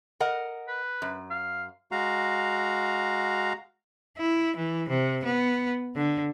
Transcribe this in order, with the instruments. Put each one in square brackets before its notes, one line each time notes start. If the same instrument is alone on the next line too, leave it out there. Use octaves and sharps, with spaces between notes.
[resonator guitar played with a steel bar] A#4 D#5 F#5
[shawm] B4
[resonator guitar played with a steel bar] F#2
[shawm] F5
[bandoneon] G#3 F#4 F5 A#5
[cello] E4
E3
C3
B3
D3